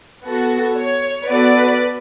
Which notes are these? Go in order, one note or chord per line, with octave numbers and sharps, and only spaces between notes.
B3 F#4 A4
C#5
B3 F#4 A4 B4 D5